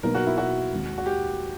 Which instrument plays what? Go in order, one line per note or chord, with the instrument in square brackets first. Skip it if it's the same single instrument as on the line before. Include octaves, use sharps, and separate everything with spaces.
[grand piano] B2 F#3 A#3 D#4 [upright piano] A#4
[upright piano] F#4
E4
F#4
[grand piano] D#2 D#3 G#3 C4
[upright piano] F#4
G4